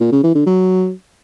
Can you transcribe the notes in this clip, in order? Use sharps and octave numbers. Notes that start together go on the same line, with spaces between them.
A#2
C#3
E3
D3
F#3